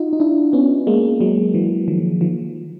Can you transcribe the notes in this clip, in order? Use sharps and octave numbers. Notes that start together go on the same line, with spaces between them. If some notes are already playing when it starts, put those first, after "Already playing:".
Already playing: D#4 F4 F#4
D#4
D4 E4
B3 C#4
G#3 A#3
F#3 G#3
E3 F#3
D#3 F3
D#3 F3